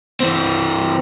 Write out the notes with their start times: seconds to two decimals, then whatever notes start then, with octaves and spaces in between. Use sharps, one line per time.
0.20 E3 C4